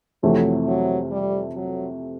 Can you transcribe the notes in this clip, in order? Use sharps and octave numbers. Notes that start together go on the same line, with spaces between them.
F2 C3 E3 F#3 A3
F#3
G3
F#3